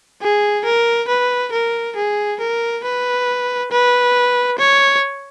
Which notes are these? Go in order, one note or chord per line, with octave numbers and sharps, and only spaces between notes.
G#4
A#4
B4
A#4
G#4
A#4
B4
B4
C#5